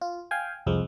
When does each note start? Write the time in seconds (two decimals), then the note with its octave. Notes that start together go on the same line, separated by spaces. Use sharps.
0.01 F4
0.31 F5 G5 G#5
0.67 C2 F2 F3 G#3